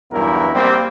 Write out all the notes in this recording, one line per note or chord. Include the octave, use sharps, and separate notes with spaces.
B1 E2 G2 B3 E4 A#4
A#1 G3 A#3 C4